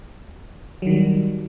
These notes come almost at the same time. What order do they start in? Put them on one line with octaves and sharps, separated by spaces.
F#3 D#3 G3